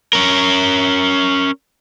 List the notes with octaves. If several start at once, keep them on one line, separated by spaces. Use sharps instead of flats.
C#4 A#4